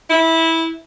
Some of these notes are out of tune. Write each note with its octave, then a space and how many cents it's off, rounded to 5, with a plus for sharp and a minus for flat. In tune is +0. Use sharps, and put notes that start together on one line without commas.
E4 -15